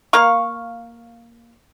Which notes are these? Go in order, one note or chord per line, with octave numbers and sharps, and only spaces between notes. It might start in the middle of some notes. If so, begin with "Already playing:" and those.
A#3 F5 C#6